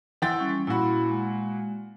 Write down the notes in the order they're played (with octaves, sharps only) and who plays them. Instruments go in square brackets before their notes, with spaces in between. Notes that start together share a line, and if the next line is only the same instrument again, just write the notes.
[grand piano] E3 G5 A6 [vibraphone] F#5 C6 E6
[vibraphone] G3 C#4
[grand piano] A#2 F#4 [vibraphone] E4 B5
[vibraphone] G#3